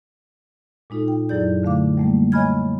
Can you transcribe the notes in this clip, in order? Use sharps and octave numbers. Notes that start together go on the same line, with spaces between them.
A#2 G#3 D#4 F4 A4
G5
F#2 F#3 E4 G#4 D5 G6
D3 A3 F5 D6
G3 A3 A#3
C#5 D#5 G#5 B5 F6 G#6